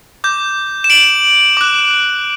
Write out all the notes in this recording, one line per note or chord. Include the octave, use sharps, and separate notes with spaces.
D6 G6
E7
D7 F#7
D6 F#6